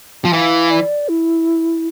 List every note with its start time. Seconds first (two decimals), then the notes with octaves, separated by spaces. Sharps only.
0.25 F3
0.32 E3 F5
0.70 D5
1.09 E4